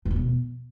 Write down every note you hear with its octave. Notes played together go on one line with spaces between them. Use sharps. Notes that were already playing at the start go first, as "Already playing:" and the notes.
G2
F2
B2